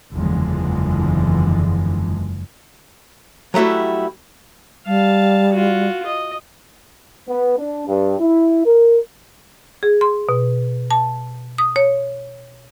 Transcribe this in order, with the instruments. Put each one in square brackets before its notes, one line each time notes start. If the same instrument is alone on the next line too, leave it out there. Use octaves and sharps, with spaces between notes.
[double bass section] F#1 E2 D3 E3 F3 G#3
[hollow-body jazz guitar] F#3 G3 A3 E4 F#4
[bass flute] G3 [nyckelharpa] F5 A5
[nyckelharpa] F4 F#4
D#5
[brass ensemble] B3
D4
G2
E4
A#4
[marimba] G#4
C6
B2
A5
D#6
C#5